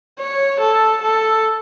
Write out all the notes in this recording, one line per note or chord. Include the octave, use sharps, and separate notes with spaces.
C#5
A4
A4